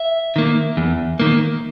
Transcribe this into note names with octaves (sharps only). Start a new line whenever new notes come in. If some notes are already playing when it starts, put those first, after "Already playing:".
Already playing: E5
D#3 A#3
E2
D#3 A#3